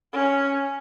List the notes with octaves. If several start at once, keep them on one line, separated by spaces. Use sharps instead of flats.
C#4